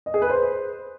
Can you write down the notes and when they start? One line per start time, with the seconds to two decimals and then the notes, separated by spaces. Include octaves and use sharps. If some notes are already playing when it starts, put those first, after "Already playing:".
0.06 D#5
0.14 G#4
0.22 B4
0.30 C5